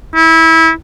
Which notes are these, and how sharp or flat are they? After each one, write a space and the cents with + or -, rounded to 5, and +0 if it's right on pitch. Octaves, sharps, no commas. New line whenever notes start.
E4 -25